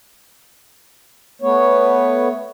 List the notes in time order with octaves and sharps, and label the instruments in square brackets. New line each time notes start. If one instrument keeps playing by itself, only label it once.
[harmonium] A3 B3 C#5